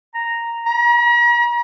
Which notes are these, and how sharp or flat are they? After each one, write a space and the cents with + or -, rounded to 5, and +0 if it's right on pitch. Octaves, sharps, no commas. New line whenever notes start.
A#5 -5
A#5 +45